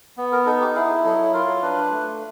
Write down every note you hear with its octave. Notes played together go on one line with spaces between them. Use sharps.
B3
A#4
D#4 A4
G4
E4 G#4
F#3 A4
F4 A#4
D4 B4
A3